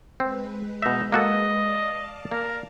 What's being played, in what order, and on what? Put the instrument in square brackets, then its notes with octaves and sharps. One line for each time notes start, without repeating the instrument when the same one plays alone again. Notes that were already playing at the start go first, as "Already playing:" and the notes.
[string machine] G#3 B4 [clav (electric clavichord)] C4
[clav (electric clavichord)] B2 E5 [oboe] D#4
[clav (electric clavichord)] A#3 F#4 A4 [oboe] D#5
[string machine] D5 F5 A5
[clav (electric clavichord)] A#3 [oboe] A#4